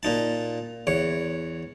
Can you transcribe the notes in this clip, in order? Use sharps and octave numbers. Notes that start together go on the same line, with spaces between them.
A#2 D#4 A5
E2 C#5